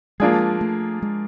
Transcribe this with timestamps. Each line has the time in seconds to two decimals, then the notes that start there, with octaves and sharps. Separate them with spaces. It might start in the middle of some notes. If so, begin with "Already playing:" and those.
0.20 F3 G#3 A#3 D4 F4 G#4
0.61 A3
1.02 G#3